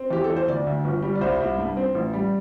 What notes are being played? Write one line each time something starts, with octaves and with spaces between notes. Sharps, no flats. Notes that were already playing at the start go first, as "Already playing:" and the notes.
Already playing: C4
E2 G4
A4
E2
C5
D2 D5
D2
G1
G3
D5
C2 C5
C2
G2
C4
A1
G3